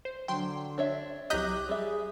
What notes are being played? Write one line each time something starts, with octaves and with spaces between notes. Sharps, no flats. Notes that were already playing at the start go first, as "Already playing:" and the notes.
C5
D3 F#3 G5 C6
D4 C#5 E5
C2 F#3 G4 D#5 A#5 F#6 G6 B6
G3 G#4 E5